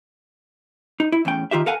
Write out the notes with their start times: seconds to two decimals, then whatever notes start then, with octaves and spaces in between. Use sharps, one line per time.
1.00 D#4
1.12 E4
1.25 E2 A2 C#4 G5
1.51 D#3 F4 G4 E5
1.66 A4 A#4 F5 F#5 G#5